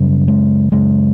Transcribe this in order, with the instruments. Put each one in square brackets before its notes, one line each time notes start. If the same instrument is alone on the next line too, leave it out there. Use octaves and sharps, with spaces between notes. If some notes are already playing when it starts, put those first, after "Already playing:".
Already playing: [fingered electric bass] F#2 C#3 G3
G#3
F#2 C#3 G#3